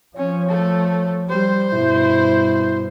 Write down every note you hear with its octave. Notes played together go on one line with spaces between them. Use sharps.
F3 C#4 C#5
A3 A4
G3 C5
G2 B2 E4